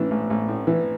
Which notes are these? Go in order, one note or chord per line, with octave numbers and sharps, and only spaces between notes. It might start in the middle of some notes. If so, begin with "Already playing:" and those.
Already playing: A1 A2 E3 C#4 D4
A1
A1
A2
E3